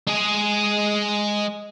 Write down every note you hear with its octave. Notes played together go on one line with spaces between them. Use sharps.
G#3 G#4